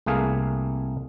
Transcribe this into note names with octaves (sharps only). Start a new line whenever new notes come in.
C2 A3 A#3 G#4 F5